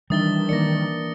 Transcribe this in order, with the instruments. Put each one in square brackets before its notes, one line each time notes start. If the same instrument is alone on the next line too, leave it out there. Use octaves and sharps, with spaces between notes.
[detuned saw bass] D#3 [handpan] E3 D4 E5 [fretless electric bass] G3 [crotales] D#6 A6 G7
[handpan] A#3 A#4 D5 [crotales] A#6 C#7